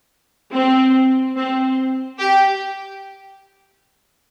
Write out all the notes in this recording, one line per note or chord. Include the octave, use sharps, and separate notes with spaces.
C4
C4
G4